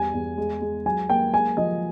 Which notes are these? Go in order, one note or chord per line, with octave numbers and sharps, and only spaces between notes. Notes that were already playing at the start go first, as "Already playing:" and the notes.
Already playing: E2 G3 G#5
E2
G#3
G#3
F#3 G#5
A#3 G5
G#3 G#5
F3 D#5